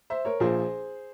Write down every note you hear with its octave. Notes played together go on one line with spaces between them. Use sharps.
C5 E5
A#4 C#5
A#1 A#2 F3 G#4 C5